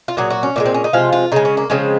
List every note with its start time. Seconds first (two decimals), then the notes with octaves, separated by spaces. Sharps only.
0.08 F4
0.17 A#2 F#3 G#4
0.30 F#4
0.43 C#4
0.56 A#2 F3 G#3
0.66 C4
0.74 C#4
0.84 D#4
0.93 C3 F3 G#3 F4
1.13 F4
1.32 C#3 G#3 D#4
1.45 C#4
1.57 A#3
1.70 C#3 F3 G#3 C4